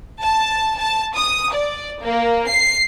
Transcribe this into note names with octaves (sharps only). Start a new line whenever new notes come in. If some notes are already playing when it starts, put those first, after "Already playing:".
A5
A5
D#6
D5
A#3
C7